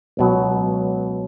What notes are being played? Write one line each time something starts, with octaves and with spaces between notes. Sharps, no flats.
C#2 B2 F#3